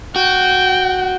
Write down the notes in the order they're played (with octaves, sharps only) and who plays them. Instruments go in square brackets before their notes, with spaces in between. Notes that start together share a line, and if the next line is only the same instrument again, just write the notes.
[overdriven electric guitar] F#4 [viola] G5